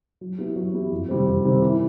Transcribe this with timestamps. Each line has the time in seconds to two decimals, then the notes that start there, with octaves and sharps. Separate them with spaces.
0.21 F#3
0.38 B3 E4 G4
0.56 F#3
0.74 B3 E4 G4
0.91 F2
1.09 C3 D#3 G3 C4
1.26 F2
1.44 C3 D#3 G3 C4
1.62 E3